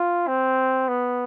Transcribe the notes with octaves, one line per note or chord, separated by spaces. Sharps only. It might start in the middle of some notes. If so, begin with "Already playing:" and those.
Already playing: F4
C4
B3